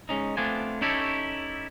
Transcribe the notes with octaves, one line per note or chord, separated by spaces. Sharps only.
G#3 C#4 D#4
A3 B3 C4 D4 F4 G#5
C#4 D#4 E4 G4 A4 C#5